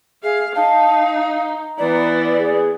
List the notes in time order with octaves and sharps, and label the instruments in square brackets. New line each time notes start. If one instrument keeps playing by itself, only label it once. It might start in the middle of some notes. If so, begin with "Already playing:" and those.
[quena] G#4 [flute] E5 [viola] F5
[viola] D#4 [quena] F5 [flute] A5
[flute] A#5
[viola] E3 B3 [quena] D5
[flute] G#4